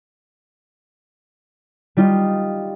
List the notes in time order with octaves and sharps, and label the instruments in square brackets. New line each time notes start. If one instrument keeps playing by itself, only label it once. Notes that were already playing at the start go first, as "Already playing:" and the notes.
[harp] G3 D#4 F4